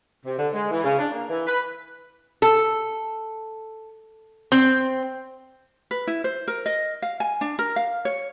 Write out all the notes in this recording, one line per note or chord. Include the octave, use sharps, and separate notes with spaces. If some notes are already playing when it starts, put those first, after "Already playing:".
C3
D3
G#3
E3
C#3
D4
A#3
E3
B4
A4
C4
B4
E4
C5
A#4
D#5
F5
G#5
D4
A#4
F5
C#5